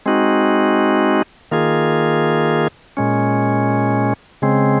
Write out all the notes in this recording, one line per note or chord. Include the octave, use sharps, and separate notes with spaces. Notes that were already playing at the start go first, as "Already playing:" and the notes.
G#3 C4 D#4 F#4
D#3 A#3 F4 G#4
A#2 G#3 C#4
C#3 G#3 C4